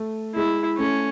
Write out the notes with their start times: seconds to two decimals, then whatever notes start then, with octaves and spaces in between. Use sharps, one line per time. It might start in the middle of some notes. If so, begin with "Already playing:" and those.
Already playing: A3
0.35 G#3 E4
0.78 A3 C#4